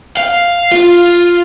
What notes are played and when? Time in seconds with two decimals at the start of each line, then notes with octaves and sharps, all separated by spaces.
0.17 F5
0.72 F4